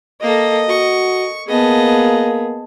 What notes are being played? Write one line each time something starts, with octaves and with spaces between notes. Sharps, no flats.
A#3 A4 D#5
F#4 C#6
A#3 B3 G#4 D#5 A5